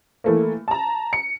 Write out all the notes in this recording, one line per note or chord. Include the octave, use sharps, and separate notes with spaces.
E3 A3 A#3
A5 A#5
C#7